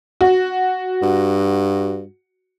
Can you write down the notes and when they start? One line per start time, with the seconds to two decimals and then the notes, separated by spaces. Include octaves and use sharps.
0.21 F#4
1.02 G2